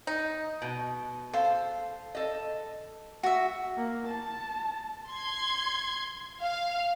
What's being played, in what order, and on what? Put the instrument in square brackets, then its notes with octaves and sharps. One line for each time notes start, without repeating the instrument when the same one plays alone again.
[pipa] D#4
[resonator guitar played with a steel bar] B2
[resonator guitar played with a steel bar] A4 F5 [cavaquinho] C5
[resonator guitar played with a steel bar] A4 D#5
[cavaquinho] F#4 E5
[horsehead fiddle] A#3
A5
[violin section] C6 G#6
F5